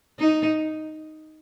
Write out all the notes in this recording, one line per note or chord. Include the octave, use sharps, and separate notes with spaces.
D#4